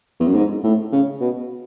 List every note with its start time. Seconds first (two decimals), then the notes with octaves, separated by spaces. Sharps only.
0.20 E2
0.27 F#2
0.34 G#2
0.64 A2
0.92 C#3
1.20 B2